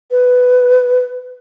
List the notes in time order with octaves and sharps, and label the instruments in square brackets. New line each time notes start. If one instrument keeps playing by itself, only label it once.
[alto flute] B4